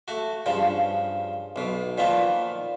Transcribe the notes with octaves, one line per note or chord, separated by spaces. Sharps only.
A3 F#4
G2 C#3 F3
B1 B2
A#2 D#3 F3 B3